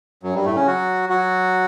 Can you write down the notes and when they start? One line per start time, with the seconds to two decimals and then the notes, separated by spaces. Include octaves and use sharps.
0.23 F#2 F#3
0.34 G2 G3
0.45 A2 A3
0.56 C#3 C#4
0.67 F#3 F#4
1.09 F#3 F#4